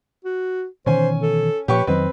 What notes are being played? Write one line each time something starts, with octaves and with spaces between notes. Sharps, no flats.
F#4
B2 D#3 E3 C#4 C5 G#5
A4
A#2 F3 G4 B4 C#5 C#6
F2 D#3 F#3 C4 B4 D#5